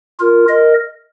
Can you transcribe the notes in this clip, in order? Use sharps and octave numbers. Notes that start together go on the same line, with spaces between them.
F4 A#4
A#4 D#5